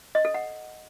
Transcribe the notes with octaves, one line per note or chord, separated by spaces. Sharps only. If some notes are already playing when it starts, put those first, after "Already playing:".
D#5
A4
F#5